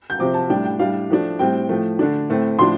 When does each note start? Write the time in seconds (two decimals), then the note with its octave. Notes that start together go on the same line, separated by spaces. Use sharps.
0.10 G6
0.19 C3 F3 C4 D6
0.34 A5
0.50 A2 G3 D4 G5
0.65 G5
0.79 A2 G3 D4 F5
1.10 A2 F3 A3 D4
1.39 A2 G3 C4 G5
1.69 A2 F3 A3
1.99 D3 A3 D4
2.30 A2 A3 C4
2.59 A2 F3 D4 C6